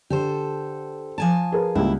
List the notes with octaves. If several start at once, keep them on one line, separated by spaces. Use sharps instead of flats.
D3 G4 A4 C5
F3 G#5 A5
G#4 A#4 B4
C#2 G3 A#3 E4